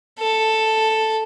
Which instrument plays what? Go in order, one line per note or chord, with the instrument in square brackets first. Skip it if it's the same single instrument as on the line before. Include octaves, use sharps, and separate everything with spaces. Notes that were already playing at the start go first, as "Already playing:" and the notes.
[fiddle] A4